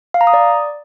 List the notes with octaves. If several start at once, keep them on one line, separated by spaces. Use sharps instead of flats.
F5
A#5
D#6
D5